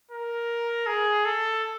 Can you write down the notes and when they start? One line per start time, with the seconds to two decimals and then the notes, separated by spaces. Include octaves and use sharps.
0.11 A#4
0.87 G#4
1.25 A4